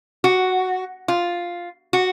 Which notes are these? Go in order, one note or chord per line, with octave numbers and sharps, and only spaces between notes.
F#4
F4
F#4